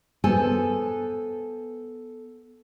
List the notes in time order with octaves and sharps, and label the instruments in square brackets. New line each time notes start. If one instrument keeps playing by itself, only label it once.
[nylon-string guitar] B3 A4 C5 G#5